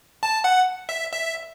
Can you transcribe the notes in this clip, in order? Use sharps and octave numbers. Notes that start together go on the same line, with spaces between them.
A5
F#5
E5
E5